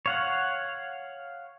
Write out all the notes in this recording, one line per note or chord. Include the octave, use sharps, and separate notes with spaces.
C#5 F5 F#5